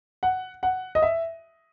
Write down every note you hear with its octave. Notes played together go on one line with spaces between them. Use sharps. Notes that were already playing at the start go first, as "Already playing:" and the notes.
F#5
F#5
D#5
E5